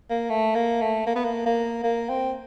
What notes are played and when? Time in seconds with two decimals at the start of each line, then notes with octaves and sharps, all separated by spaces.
0.10 A#3
0.30 A3
0.55 A#3
0.81 A3
1.07 A#3
1.16 B3
1.24 A#3
1.46 A#3
1.84 A#3
2.09 C4